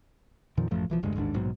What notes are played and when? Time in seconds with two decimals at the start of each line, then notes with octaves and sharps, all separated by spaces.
0.57 F2 A#2 D#3 F3
0.71 A1 F#2 F3 A3
0.90 B1 E3 F3
1.03 F1 D2 G2 G#3
1.16 A1 D#2 G#2 D4
1.34 A#1 G#2 B2 F#3